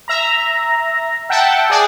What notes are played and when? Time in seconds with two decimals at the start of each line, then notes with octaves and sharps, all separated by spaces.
0.08 E5 A#5
1.29 E5 F#5 G5 A5
1.70 G#4 D5